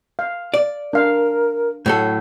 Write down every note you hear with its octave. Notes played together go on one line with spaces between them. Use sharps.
F5
D5
D4 A#4 F5
A2 F#3 A4